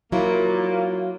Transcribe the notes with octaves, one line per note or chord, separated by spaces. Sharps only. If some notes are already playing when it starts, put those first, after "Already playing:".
A#2 F#3 A#3 E4